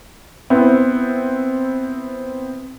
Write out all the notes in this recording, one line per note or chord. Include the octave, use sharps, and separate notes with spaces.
B3 C4 E4